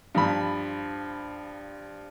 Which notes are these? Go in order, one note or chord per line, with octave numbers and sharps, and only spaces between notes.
G2 F3 B5